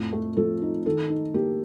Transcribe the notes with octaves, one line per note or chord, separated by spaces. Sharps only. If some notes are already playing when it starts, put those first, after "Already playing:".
Already playing: F2 A2
A3
F3 A4
D#4
D#3 A4
D#4
A#3 G4